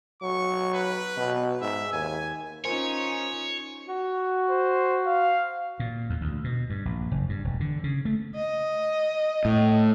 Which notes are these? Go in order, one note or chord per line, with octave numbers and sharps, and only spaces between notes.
F#3 C#6
B4
B2
G#2 E5
D#2 G#5
C#4 D#4 F4 A#4 C5 C#5 G#5
F#4
C5
F5
A#2
E2
D2
B2
G2
A#1
F#1
G2
E1
D3
C#3
A3
D#5
A2